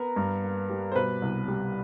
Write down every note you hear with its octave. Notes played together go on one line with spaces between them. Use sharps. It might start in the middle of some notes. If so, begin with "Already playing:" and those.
Already playing: B3 A#4
G2
A#3
G3
C5
B2 B4
C2
G3